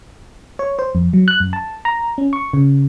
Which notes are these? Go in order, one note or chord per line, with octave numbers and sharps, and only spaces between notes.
C#5
C5
F2
F#3
F#6
F#2
A5
A#5
C#4
C#6
C#3